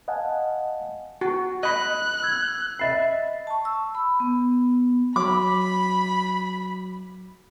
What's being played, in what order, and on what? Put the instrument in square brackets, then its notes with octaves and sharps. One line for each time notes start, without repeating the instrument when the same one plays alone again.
[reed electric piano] D#5 F5 F#5 G#5 A5
[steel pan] F#4
[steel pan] D#5 B5 [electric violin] F#6
[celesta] E6 G#6
[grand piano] D#5 E5 B5 [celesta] A6 C7
[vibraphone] A5 C#6
E6
B5
B3
[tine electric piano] F#3 [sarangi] B5 [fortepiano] D6